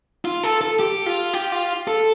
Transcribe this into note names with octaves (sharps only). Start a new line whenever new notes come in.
F4
A4
A4
G4
F4
G4
F4
A4